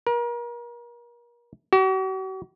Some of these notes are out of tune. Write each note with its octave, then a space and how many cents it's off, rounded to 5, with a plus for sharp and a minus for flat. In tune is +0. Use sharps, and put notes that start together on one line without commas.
A#4 +35
F#4 +45